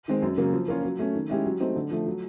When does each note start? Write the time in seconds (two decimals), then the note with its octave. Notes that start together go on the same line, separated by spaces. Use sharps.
0.08 D#3 G#3 C4
0.22 F#2
0.37 C#3 F#3 A#3
0.53 F3
0.68 A#3 C#4 F4
0.83 F#3
0.99 A3 C#4
1.15 D#3
1.30 G#3 C#4 E4 G4
1.45 F#3
1.60 A3 C4 D#4
1.76 D3
1.91 F3 A3
2.07 F#3